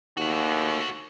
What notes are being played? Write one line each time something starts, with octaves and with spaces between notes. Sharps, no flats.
D#2 A3 F#4